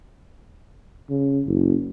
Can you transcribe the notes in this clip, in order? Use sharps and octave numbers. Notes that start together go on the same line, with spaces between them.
C#3
F#1